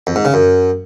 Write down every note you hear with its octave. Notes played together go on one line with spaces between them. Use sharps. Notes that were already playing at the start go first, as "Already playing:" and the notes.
F2
G#2
C#3
F#2